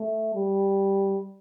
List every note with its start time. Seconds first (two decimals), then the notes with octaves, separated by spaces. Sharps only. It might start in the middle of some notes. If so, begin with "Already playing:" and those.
Already playing: A3
0.35 G3